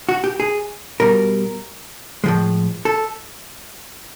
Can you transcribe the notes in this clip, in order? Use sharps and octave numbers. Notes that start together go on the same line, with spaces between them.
F#4
G4
G#4
B2 G3 A#4
A2 F3 G#3
A4